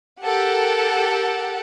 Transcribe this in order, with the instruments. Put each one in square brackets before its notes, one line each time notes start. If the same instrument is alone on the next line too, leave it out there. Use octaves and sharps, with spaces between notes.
[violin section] G4 A4 A#4 F#5